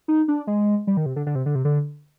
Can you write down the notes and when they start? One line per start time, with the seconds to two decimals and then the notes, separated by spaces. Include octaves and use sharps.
0.08 D#4
0.28 D4
0.47 G#3
0.87 G3
0.97 D#3
1.06 C3
1.16 D3
1.26 D3
1.35 C3
1.46 D3
1.55 C3
1.65 D3